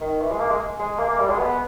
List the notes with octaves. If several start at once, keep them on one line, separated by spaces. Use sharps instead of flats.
D#3
E3
G#3
A#3
G#3
G#3
A#3
A#3
G3
G#3
B3